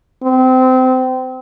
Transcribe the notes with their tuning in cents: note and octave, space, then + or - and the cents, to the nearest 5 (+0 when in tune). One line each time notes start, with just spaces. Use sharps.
C4 -25